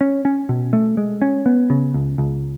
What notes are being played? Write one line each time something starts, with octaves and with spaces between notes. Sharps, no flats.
C#4
C#4
B2
A3
G#3
C#4
B3
C#3
C#2
C#2